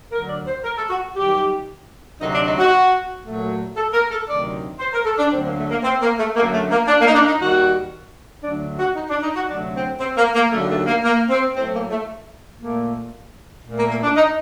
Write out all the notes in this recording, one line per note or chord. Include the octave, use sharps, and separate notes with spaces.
D2 D3 F#3 A#4
D5
C5
A#4
A4
F#4
F#2 D#3 G3 G4
D2 C3 F#3 A3 D#4
D4
D#4
F#4
A#2 F#3 A3
A4
A#4
A4
D2 C3 D#3 F#3 A3 D5
C5
A#4
A4
D4
D2 D3 F#3 C4
A#3
A3
A#3
C4
A#3
A3
F#2 D3 F#3 A3 A#3
A3
A#3
D4
A#3
D#4
D4
D#4
D#2 D#3 G3 F#4
D2 D3 F#3 A3 D4
F#4
D#4
D4
D#4
F#4
D2 C3 F#3 A3 D4
C4
C4
A#3
A#3
D#2 D3 F#3 A3
A3
A#3
A#3
C4
A2 F#3 A3 C4
A#3
A3
A#2 A3 A#3
A#2 A3
A#3
A#3
D4
D#4